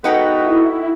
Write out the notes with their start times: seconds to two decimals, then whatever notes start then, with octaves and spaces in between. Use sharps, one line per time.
0.04 G#3 B3 D#4 F#4 A4 B4 F#5 G5
0.40 E4